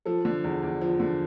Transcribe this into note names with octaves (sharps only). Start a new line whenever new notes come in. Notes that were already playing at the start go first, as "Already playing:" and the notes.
F3 A4
D3
E2
E2
F3
D3